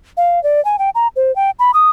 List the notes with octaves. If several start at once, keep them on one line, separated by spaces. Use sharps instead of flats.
F5
D5
G#5
G5
A#5
C5
G5
B5
D#6